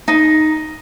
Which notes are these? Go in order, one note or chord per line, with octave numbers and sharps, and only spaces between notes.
D#4